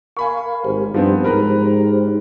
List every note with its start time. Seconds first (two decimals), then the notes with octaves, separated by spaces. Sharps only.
0.17 A#4 F5 G#5 B5 C#6
0.65 G#1 G4 A#4 C5
0.94 G2 F3 B3 C4 D#4 G4 C5
1.24 G#2 A#4 B4 A#5